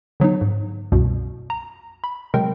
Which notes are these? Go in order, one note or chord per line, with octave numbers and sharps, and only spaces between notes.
D3 F#3 B3 D#4
G#2
C2 F#2 B2
A#5
B5
C3 F#3 G#3 A#4 G5